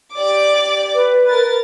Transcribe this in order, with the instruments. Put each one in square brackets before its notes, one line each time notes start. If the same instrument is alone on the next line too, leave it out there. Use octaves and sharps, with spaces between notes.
[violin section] G4 D5 D6
[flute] B4
[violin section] A#4 A6